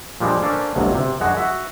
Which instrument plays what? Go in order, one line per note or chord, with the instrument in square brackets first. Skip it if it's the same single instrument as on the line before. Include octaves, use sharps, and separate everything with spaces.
[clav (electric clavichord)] A#2 F3 G3 G#3 D4
A#3 C#4 D4 A4 C5
G1 D2 C3 D#3 F#3
C3
F#2 G#3 D4 F#4 G#4 F#5
F#4 E5